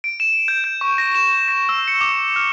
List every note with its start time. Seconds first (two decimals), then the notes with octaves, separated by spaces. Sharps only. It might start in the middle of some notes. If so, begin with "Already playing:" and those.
0.04 D7
0.20 E7
0.48 G6
0.64 G6
0.81 C#6
0.98 A#6
1.15 E7
1.48 A#6
1.69 E6
1.88 C#7
2.01 D6
2.36 F6